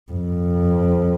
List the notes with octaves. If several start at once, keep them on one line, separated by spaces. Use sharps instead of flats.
F2